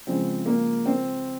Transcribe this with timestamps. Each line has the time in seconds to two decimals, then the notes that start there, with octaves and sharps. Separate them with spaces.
0.07 C#3 F3 G#3 C4
0.46 A#3
0.86 C4